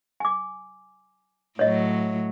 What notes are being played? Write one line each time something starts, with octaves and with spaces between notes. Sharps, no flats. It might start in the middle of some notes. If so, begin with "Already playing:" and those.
G#5 D6
A2 F#3 C#5 D#5